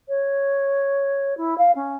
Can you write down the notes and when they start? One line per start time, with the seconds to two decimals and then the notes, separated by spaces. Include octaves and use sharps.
0.08 C#5
1.37 E4
1.57 F5
1.75 C#4